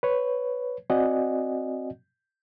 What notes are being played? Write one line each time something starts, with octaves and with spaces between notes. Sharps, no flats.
B4 C#5
C4 F#4 D5 D#5 F#5 G#5